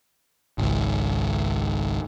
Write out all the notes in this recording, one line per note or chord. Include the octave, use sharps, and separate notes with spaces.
G#1 C#2